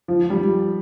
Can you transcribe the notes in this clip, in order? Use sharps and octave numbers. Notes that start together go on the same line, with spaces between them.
F3
G3